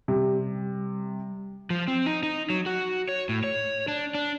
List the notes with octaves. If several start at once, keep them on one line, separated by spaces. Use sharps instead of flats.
C3 G3
F3
C4
D#4
D#4
F#3
F#4
C#5
A2
C#5
D4
D4